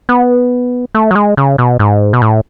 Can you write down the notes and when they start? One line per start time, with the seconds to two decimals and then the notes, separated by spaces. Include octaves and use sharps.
0.09 B3
0.95 A3
1.11 F#3
1.15 G#3
1.37 C#3
1.58 B2
1.79 G#2
2.13 B2
2.22 A2